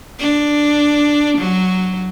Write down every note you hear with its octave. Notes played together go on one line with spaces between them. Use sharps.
D4
F#3